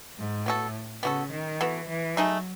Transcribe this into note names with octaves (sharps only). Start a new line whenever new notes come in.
G#2
A2 B3 F#4 A4
C#3 B3 F#4 A4
D#3
E3 B3 F#4 A4
E3
F#3 A3 D#4 G#4